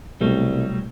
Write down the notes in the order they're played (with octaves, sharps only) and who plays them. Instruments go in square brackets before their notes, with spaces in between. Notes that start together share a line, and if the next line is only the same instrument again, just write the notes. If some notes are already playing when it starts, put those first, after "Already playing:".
[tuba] C2 [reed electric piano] B2 A3 [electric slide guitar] F#3 G3